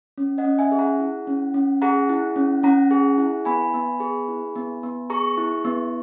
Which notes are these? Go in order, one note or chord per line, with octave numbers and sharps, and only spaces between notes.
C#4
D#5 F#5
C#4
E5 G#5
G#4
F#5 A#5
E4
C#4
C#4
G#4 F#5 A#5
E4
C#4
C#4 F#5 A#5
G#4
E4
B3 G#5 B5
B3
G#4
E4
B3
B3
G#4 A#5 C#6
E4
B3